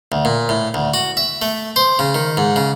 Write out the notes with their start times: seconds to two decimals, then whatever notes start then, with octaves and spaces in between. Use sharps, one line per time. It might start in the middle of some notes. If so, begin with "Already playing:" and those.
0.12 D2
0.25 A#2
0.49 A2
0.74 D2
0.94 F#4
1.17 E5
1.42 A3
1.76 C5
1.99 C#3
2.15 D#3
2.37 G#2
2.56 C#3